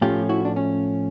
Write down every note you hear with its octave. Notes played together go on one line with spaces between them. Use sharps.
A2 F3 A3 C#4 F4 G4
E4 F#4
D4
C#4